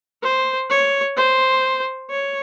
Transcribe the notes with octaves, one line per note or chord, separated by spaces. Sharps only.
C5
C#5
C5
C#5